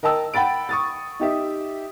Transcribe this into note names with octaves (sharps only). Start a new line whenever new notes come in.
A#4 D#5 G5 A5 E6
F#5 G5 B5 A6 D7
C#6 D#6 A6
D#4 G4 E5